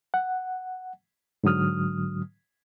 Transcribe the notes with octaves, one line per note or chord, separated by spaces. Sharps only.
F#5
G#2 D3 F#3 D#6 F6